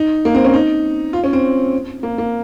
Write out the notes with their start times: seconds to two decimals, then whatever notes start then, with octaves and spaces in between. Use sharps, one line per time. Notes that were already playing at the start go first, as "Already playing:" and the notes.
Already playing: D#4
0.25 A#3
0.35 C4
0.44 C#4
0.53 D#4
1.13 F4
1.24 C#4
1.33 C4
2.03 A#3
2.18 A#3